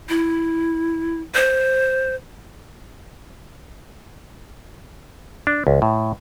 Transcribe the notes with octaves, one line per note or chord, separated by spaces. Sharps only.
E4
C5
D4
C#2
A2